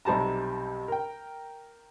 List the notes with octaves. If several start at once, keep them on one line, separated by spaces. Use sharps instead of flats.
B1 C3 G3 A5 A#5
A#4 G5